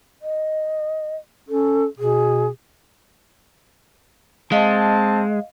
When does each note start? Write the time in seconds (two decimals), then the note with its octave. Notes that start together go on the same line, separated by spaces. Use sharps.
0.22 D#5
1.49 C#4 A4
1.99 B2 G#4
4.52 G#3 C4 D#5 F5 A5